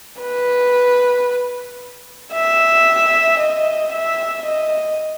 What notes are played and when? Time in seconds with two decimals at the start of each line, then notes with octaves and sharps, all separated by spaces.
0.22 B4
2.33 E5
3.40 D#5
3.93 E5
4.46 D#5